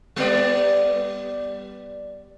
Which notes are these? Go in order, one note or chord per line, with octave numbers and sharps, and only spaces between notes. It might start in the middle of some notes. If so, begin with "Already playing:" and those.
G3 B3 D5